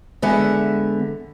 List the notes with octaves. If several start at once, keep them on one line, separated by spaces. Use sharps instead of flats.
D3 G#3 B3 E5 F#5